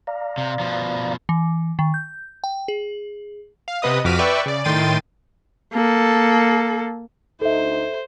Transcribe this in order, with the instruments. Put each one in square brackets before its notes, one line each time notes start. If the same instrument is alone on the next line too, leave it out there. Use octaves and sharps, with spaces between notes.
[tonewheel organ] D5 F5 A#5
[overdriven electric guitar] C3
B2 F3
[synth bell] E3
D#3
G6
G5
G#4
[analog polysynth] F5
C3 B3 B4 D#5 D#6
F2 F#4 D6 F6 B6 D#7
B4 D5 E5 G5 C#6
C#3 D5
A2 D#3 G5 C6 A6 D#7
[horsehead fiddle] A#3 A4
[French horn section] D2 D#4 [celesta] A4 E5 [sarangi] C5